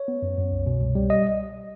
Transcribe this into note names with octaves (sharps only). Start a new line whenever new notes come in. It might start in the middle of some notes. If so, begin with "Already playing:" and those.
Already playing: C#5
B3
F#2
F#2
C2
B2
C2
G3
D#5